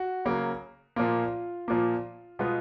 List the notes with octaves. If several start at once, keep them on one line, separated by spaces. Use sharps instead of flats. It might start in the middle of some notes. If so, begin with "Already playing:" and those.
Already playing: F#4
C#3 F#3 A#3
A#2 F3 A#3 F4
A#2 F3 A#3
B2 G#3 B3 F4